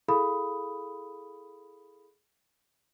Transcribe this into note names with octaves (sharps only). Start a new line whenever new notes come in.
E4 G#4 A4 F5 B5 D#6